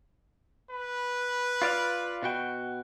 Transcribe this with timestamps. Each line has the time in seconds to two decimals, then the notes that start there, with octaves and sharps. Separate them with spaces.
0.71 B4
1.62 F4 D5 F5
2.22 B2 F#4 G5